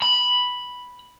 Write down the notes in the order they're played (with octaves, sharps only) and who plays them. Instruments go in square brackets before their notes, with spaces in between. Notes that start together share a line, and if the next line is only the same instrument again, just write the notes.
[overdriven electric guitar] B5